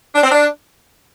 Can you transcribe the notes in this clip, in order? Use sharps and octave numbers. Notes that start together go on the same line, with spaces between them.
D4
C4
D4